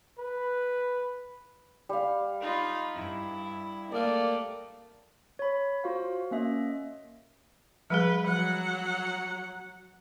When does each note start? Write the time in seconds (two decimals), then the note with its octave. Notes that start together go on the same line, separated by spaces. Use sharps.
0.19 B4
1.89 G3 F5
2.41 D#4 F4 B5
2.95 G2 E4
3.92 A3 A#3 D5 D#5
5.39 C#5 B5
5.84 F4 F#4 C5 F5
6.31 A#3 C#4 D#5 E5
7.90 F3 G3 G#4 B4
8.27 F3 F#3 F#5